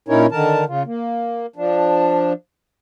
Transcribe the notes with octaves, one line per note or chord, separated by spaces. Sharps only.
A#2 C#4 D#4 E4 A#4 C#5
D3 D#3 A#4 A5
C#3 F4
A#3
F3 D4